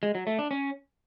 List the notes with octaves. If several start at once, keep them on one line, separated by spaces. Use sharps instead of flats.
G#3
F#3
A3
D4
C#4